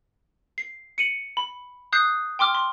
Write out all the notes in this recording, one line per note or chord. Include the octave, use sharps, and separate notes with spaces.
C7
C#7 D#7 F#7
B5
D#6 F#6 G6 C7
G5 C6 D6 F6
C6